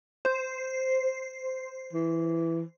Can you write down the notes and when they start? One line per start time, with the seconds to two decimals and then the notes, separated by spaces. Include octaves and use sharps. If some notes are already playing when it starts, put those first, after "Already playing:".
0.25 C5
1.93 E3